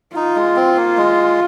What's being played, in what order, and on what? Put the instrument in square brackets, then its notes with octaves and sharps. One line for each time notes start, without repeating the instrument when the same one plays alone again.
[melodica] D#4 [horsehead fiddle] F4
[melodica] G#3
C4
A#3
G#3